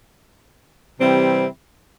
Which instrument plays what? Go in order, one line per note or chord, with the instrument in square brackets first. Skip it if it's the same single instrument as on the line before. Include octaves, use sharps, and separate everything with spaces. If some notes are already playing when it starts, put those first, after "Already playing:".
[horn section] C3 E3 G3 C4 E4